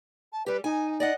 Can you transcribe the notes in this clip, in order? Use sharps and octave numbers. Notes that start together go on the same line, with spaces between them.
A5
G3 G4 B4
D#4 G#5
D5 D#5 F#5